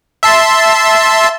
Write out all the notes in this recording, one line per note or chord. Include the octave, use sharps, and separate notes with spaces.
E5 A5 C6